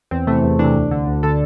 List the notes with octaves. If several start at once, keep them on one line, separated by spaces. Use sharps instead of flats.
E2 C4
C3 E3 A3
E2
C3 E3 D4
D2
D3
D2
D3 A4